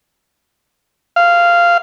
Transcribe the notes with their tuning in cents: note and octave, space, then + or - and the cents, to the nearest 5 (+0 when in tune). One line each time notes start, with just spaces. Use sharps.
F5 -10